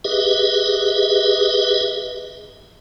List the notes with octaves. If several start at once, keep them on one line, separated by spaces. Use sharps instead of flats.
G4 G#4 B4 D#5 E5